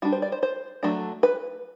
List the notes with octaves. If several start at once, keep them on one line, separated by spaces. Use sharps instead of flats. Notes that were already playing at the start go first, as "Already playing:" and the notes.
G3 D4 F#4
C5
D5
C5
C5
F#3 A3 D4
B4